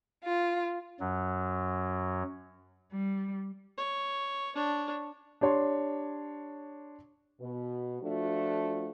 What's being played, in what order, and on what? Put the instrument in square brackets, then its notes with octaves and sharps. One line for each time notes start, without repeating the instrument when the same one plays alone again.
[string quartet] F4
[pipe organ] F#2 F#3
[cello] G3
[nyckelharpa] C#5
D4 C#5
[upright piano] D4 G4 C#5 C6
[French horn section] B2
F3 A3 D4 F4 F#4